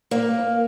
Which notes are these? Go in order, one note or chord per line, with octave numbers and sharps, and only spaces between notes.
A#3